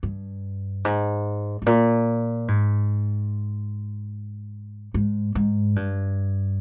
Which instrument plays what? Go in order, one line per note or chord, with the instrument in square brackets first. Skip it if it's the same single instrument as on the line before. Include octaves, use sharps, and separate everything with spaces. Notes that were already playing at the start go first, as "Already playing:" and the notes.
[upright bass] G2
G#2
G#2
A#2
G#2
G#2
G#2
G2